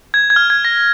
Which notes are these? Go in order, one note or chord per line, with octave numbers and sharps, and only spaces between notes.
G#6
G#6
F6
G#6
A#6